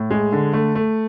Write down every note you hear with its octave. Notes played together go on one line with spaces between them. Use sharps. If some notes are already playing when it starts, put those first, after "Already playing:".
Already playing: A2
G#3
D3
A3
A3